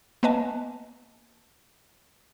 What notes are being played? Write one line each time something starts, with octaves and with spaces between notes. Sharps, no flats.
A#3 B3 B4 D#5 G#5 A5